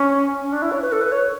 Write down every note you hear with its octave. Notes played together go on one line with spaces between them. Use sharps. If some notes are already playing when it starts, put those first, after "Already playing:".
Already playing: C#4
C#4
D4
E4
C#5
B4
A4
B4
C#5